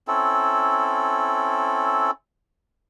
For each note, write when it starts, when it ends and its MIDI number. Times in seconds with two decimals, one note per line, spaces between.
0.08 2.11 60
0.08 2.11 61
0.08 2.11 64
0.08 2.11 69